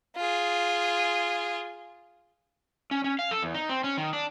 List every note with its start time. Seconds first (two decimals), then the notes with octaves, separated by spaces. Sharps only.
0.16 F4 G#4
2.91 C#4
3.04 C#4
3.19 F5
3.31 A4
3.43 E2
3.54 D#4
3.69 C4
3.84 C#4
3.98 D#3
4.13 D4